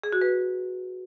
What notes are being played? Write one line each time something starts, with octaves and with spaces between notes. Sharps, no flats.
G#4
F#4
B4